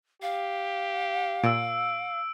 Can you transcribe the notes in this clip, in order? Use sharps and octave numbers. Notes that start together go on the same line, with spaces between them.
G4 F5
A#2 E6 D7